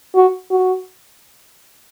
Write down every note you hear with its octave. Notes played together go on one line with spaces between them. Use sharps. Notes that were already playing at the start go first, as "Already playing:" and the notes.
F#4
F#4